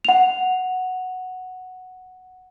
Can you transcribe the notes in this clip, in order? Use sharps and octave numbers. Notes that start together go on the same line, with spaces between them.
F#5 F7